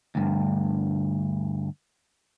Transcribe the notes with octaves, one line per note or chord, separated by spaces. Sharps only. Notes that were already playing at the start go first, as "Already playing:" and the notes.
D2 G2